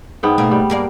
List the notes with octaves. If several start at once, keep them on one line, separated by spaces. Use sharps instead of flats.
G#2 B3 G5
B2 A3 A#3
G3
G2 A#3 D5